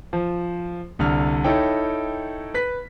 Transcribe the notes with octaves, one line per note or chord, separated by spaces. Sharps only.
F3
C2 D3 F6
D#4 E4 A4 C#5 G5
B4 B6